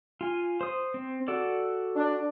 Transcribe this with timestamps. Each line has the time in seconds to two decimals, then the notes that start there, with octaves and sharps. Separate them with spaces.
0.21 F4 G#5
0.61 C5 D#6
0.94 C4
1.28 F#4 A4 D5
1.96 D4